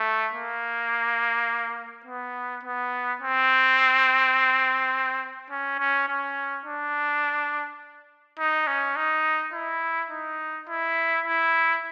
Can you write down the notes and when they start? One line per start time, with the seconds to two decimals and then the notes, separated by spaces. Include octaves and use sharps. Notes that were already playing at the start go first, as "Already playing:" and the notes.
Already playing: A3
0.34 A#3
2.05 B3
2.63 B3
3.21 C4
5.51 C#4
5.79 C#4
6.08 C#4
6.66 D4
8.39 D#4
8.67 C#4
8.96 D#4
9.53 E4
10.11 D#4
10.68 E4
11.26 E4